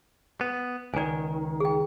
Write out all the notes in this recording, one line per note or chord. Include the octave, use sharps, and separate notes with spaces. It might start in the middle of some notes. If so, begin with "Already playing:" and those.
B3
C#2 D#3 D5 G#5
G#4 G5